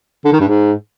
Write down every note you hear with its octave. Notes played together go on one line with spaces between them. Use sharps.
D3
D#3
G2
G#2